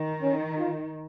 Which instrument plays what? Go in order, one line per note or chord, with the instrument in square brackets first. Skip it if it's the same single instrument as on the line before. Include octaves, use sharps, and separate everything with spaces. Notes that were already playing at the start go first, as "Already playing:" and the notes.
Already playing: [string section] D#3
[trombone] C#4
F4